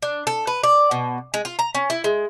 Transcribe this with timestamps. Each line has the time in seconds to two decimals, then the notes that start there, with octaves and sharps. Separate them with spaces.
0.02 D4
0.27 A4
0.47 B4
0.63 D5
0.91 B2
1.34 G#3
1.45 F4
1.59 A#5
1.75 C#4
1.90 E4
2.04 G#3